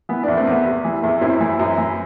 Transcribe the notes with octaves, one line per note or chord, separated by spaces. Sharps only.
E3 B3
E2 B3 D4
A3 C4
E2 B3
C3
E3
E2
F#2 C4 E4
E3
F#2
E3